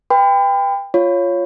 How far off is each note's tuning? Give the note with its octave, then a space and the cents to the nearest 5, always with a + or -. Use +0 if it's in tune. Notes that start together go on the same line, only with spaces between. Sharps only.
B4 +0 G5 +25 B5 +40
F4 +0 C#5 +0